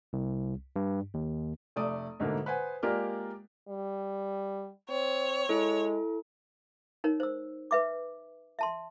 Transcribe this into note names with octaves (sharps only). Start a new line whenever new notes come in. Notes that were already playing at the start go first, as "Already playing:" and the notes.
C2
G2
D#2
F1 A3 D5 D#6
G#2 B2 D3 A3 A#3
B4 C5 F#5 G#5
G#3 A#3 F4 G4 A#4 D5
G3
C4 C#5
G#3 E4 A4
D#4 A#4 C#5
C5 E6
B4 E5 D6
E5 A5 C6